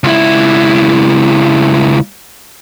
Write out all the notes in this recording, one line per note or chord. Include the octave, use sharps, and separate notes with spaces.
C#2 E4